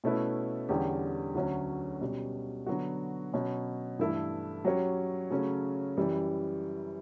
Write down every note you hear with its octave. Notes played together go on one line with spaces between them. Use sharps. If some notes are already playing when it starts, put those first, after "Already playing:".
B2 A3 C#4 E4 B4
E2 D3 G3 C#4 G4
D2 D3 F#3 C#4
B2 G3 C#4
D3 F#3 B3 F#4
B2 F#3 C#4
G2 E3 A3 E4 A4
F#3 C#4 G4 C#5
C#3 F#3 A3 C#4
F#2 E3 G3